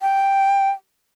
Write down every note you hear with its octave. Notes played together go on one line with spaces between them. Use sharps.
G5